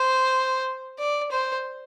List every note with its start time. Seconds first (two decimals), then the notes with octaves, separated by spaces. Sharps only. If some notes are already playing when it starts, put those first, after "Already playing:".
Already playing: C5
0.99 D5
1.31 C5